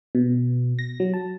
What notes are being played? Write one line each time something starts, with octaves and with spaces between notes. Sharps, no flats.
B2
A#6
F#3
A5